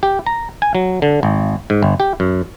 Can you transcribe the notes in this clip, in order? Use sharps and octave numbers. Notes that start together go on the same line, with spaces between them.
G4
A#5
G#5
F#3
D3
G#1
G#2
G1
G4
F#2